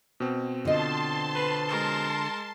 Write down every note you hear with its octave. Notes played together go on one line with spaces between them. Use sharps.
B2 C4
D3 F4 D#5 A5 C6
B4
G#3 A#4